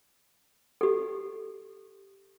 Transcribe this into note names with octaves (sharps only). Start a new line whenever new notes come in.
G4 A4